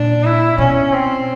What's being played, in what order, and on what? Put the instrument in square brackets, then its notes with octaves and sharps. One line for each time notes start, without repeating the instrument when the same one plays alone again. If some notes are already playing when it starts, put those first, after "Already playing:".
Already playing: [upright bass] A#2 [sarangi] D4
[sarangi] E4
[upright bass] B2 [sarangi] C#4
[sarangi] C4